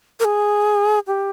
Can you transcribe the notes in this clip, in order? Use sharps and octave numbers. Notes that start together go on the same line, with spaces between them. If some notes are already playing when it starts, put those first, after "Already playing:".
A#4
G#4
G4